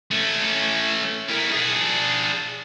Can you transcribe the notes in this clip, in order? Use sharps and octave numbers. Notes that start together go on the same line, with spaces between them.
A3 C#4
E4 A#4
D4 G#4